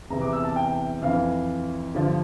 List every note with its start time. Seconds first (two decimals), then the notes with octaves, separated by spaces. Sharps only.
0.10 E2 C3 E3 A#5
0.21 D6
0.33 E6
0.44 A5
0.56 G5
1.02 F2 E3 F5
1.95 G2 D3 F3